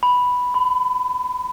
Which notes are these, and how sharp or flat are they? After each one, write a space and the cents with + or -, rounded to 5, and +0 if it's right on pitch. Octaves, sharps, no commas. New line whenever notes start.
B5 +0
B5 +35